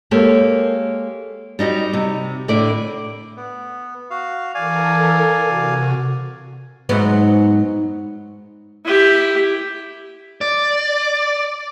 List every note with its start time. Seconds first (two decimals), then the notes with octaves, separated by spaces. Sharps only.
0.11 G#3 A#3 G4 A4 C#5
1.59 G3 D#4 F#4 G4
1.93 C3
2.48 A2 D3 E4 D5
3.37 B3
4.10 F#4 F5
4.55 E3 A4 A#4 D5 F5 G#5
5.45 C3 F#4
6.89 G#2 F#3 B3
8.85 E4 G4
10.41 D5